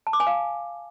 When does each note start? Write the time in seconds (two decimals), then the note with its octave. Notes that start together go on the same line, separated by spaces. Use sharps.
0.07 A5
0.13 D6
0.20 G#5
0.27 F5